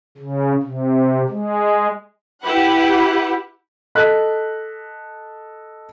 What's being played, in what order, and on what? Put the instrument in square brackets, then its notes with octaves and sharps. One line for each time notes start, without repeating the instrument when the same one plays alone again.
[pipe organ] C#3
C3
G#3
[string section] E4 G4 B4 F#5
[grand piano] A4 D#5 F#6 B6